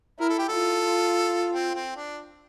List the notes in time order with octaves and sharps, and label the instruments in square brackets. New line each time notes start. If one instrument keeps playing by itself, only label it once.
[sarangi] E4 [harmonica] A#4
[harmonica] A4
G4
[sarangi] F4 [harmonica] A4
[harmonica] C4
C4
D4